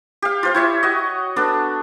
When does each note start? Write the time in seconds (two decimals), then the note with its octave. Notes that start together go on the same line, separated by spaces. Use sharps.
0.22 G4 F5
0.43 F4 C5 F5
0.54 E4 C#5 E5
0.83 F#4 D#5
1.36 B3 D4 A4